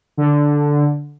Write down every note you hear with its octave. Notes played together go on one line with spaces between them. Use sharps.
D3